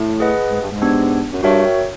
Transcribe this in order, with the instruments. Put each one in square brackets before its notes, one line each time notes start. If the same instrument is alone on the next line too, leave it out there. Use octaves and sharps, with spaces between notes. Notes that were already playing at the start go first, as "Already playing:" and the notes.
Already playing: [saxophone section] A2
[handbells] G#4 B4 D#5 F#5
[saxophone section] G#2
G2
G#2
[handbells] B3 D4 G4
[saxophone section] F#2
[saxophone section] G2 [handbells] F#4 A#4 C#5 E5 G5